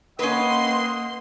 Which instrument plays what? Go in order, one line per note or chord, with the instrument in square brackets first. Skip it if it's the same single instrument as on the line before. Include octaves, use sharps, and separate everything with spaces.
[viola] A#3 [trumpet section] C4 D#5 F#5 [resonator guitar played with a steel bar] C#4 B4 [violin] C6